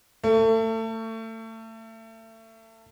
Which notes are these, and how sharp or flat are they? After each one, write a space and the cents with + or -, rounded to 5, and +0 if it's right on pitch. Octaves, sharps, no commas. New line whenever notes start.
A3 +30